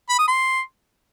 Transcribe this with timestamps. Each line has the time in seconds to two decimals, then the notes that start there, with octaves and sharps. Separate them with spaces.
0.09 B5
0.18 D#6
0.28 C6